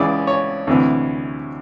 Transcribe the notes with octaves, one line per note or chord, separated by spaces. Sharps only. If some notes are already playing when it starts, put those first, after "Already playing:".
Already playing: C#2 C#3 E3 D5
C#5
D2 C3 E3